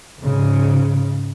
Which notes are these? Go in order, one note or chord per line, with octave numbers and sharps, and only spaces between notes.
G#2 C#3